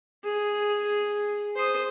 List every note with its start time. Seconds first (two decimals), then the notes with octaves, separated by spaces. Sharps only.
0.24 G#4
1.56 C5 D#6